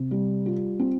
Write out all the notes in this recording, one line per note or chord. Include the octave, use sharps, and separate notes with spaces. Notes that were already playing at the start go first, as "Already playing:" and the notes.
Already playing: C3
G3
F4
C4